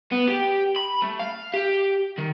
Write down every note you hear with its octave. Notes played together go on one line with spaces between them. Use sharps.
B3
G4
B5
A3
F5
G4
D#3